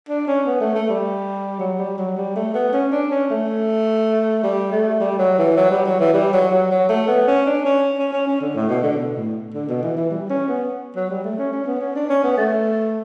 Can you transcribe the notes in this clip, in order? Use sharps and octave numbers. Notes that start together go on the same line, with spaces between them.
D4
C#4
B3
A3
A3
G3
F#3
G3
F#3
G3
A3
B3
C#4
D4
C#4
A3
G3
A3
G3
F#3
E3
F#3
G3
F#3
E3
G3
F#3
F#3
F#3
A3
B3
C#4
D4
C#4
C#4
C#4
C#4
D3
A2
B2
D3
B2
A2
D3
B2
E3
E3
G3
C#4
B3
F#3
G3
A3
C#4
C#4
B3
C#4
D4
C#4
B3
A3